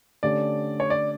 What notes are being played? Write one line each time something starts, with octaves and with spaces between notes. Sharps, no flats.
D3 A3 C#4 G4 D5
C#5
D5